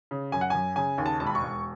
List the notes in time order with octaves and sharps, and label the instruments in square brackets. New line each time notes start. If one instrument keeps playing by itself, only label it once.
[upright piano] C#3
F#2 G#5
F#5
F#2 G#5
C#3 G#5
D#2
A5
E1 A5
B5
C#6
E1